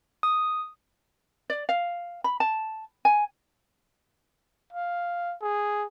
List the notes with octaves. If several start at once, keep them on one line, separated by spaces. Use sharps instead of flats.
D#6
D5
F5
B5
A5
G#5
F5
G#4